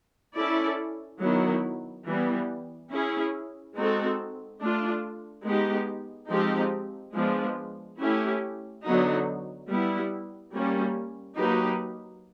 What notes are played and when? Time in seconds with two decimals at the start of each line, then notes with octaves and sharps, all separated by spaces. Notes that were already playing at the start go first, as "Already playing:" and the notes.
0.36 C#4 E4 A4 D5
1.21 D#3 F#3 B3 E4
2.06 E3 G3 B3
2.90 C#4 E4 G#4
3.75 G#3 C4 D#4 F#4 A4
4.60 A3 D4 F4
5.45 G#3 B3 D#4 G4
6.29 F3 G#3 C4 D#4 G4
7.14 F3 G#3 B3 D4
7.99 A3 C#4 E4 G4
8.84 D3 F#3 B3 D#4 F#4
9.69 G3 B3 E4
10.53 G3 A#3 C#4
11.37 F#3 A#3 D#4 G4 B4